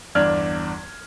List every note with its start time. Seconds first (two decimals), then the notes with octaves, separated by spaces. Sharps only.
0.15 G1 E2 D4 D5 F6 G#6